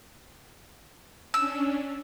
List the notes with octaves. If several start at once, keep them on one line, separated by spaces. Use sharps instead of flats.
C#4 D4 E6